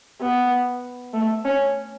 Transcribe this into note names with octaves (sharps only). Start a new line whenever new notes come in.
B3
A3
C#4